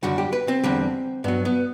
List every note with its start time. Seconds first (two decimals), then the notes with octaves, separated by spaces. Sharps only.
0.03 F#2 D3 G3 F#4
0.18 G4
0.33 B4
0.48 C4
0.64 E2 D3 G3
1.24 G2 F#3 B3
1.45 B3